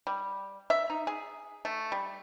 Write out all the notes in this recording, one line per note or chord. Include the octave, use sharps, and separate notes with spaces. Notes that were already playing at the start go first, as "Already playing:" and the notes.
G3
E5
D#4
G#4
A3
G3